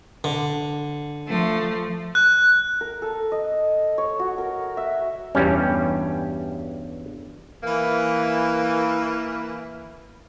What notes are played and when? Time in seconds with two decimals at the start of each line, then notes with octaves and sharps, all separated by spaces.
0.24 D3
1.27 F3 A3
2.15 F#6
2.81 A#4
3.02 A4
3.32 D#5
3.98 C#5
4.19 F#4
4.38 A#4
4.77 E5
5.35 E2 G2 B2 G3 C#4
7.63 E3 A#3